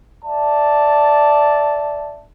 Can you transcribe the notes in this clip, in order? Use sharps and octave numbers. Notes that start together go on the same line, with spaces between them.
D5 E5 A5